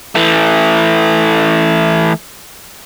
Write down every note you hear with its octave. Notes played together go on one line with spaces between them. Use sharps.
E3 A3